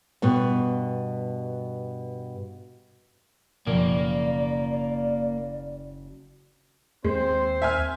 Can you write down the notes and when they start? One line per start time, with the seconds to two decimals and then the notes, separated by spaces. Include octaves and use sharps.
0.22 G2 B2 B3
3.67 F#1 B2 F3 A#3 D5
7.05 D#2 G#3 C4 C5
7.62 E5 G#5 F6